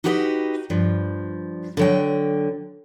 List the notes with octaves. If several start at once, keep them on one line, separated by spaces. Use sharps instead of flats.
D#4 F#4 G4 B4 C#5 D#5
G2 F3
D3 F#3 G5